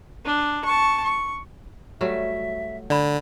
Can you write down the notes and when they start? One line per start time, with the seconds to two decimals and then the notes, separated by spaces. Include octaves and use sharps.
0.25 D4
0.65 A5 C#6
1.03 C#6
2.01 F#3 G3 A3 E5
2.90 D3 D5 B5